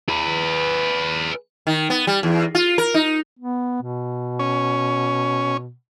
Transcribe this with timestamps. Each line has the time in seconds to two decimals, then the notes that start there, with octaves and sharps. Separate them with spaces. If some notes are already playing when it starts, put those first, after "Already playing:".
0.09 G#4 B4
1.67 D#3
1.90 B3
2.07 G3
2.23 E2
2.55 F4
2.78 A#4
2.94 D#4
3.39 B3
3.82 B2
4.39 C#4